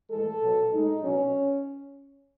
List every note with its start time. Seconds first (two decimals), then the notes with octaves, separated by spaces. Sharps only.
0.09 A2 E3 G#3 A4
0.40 B2 F#3
0.71 A2 G#3 D#4
1.01 B2 F#3 C#4